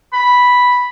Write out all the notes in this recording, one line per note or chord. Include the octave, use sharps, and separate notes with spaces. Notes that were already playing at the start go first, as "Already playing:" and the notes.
B5